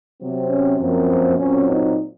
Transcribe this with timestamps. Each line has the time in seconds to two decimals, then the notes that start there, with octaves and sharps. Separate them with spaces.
0.20 C3 F#3 C4
0.49 C#4
0.79 F#2 F3 A#3 C4
1.37 A#2 F#3 C4 C#4
1.67 D#4